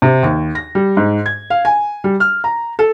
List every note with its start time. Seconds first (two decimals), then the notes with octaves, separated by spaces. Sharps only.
0.02 C3
0.23 D#2
0.55 A#6
0.75 G3
0.97 G#2
1.26 G#6
1.50 F5
1.65 G#5
2.04 G3
2.20 F6
2.44 A#5
2.79 A4